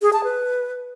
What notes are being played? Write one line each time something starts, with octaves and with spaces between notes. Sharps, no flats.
G#4
A5
B4